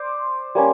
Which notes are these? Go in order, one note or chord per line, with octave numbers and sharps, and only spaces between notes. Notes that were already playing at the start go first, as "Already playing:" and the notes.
Already playing: C5 D5
G3 A#3 C#4